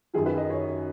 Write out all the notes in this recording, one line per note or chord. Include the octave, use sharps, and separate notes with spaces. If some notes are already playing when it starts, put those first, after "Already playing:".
F#2 D#3 F#3 G#4
B4
D#5
C#5